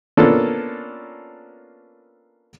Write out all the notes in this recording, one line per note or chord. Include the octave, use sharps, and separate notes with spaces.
A#3 B3 C#4 D4 F4 A4